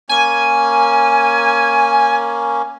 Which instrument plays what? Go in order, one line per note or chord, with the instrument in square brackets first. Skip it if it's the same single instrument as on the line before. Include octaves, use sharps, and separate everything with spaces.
[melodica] A#3 C#4 [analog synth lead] G#5